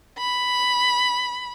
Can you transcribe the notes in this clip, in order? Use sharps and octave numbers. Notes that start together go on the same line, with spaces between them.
B5